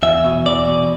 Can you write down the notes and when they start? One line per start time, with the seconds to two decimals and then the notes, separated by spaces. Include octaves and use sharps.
0.03 E2 E5
0.24 B2
0.46 E2 D5
0.68 B2